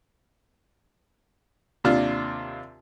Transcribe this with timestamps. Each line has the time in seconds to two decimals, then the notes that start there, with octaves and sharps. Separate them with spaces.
1.84 D#2 C3 D4 F4